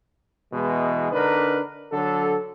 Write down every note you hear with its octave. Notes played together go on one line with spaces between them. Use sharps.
E2 B2 E3 G#3
D3 D4 D#4 A#4 B4
D3 F#3 A4